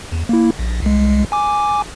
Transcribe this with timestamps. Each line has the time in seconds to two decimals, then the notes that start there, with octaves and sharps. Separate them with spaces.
0.12 E2
0.29 A#3 E4
0.59 A#1
0.82 C2 G#3
1.32 G#5 D6